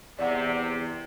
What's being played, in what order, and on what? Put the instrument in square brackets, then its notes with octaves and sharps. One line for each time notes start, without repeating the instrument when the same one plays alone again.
[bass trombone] E2 [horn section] C3 [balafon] D5 F#5